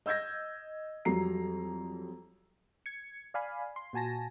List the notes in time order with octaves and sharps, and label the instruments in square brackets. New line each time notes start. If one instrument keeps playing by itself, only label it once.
[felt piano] D#5 E6 G6 G#6 A#6
F2 F#3 G3 A#5 C7
[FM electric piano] G#6 C#7
D5 F5 G#5 B5
C6
A#2 F#4 G#5 A5 A#6